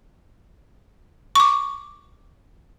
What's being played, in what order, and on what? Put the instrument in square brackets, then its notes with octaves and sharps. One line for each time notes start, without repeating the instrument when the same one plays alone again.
[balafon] C#6 D6